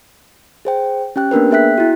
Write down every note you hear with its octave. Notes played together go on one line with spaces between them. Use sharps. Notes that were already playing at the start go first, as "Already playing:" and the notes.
G#4 C5 G5
C#4 G4 G5 F#6
A#3 B3 D4 A#4 B4
B3 G#4 E5 G5 F#6 B6
E4 F#4